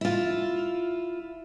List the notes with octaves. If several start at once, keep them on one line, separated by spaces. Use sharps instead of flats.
E4 F4